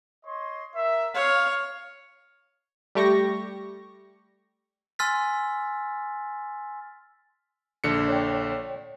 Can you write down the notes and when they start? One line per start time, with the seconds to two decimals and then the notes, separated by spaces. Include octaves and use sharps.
0.25 C#5 D#5 C6
0.73 A#4 E5
1.14 C#5 F5
2.95 G3 A3 G4 C#6 A#6
4.99 G#5 C6 E6 F6 A6 B6
7.84 A#1 D3 C#7
8.08 C#5 D5 G5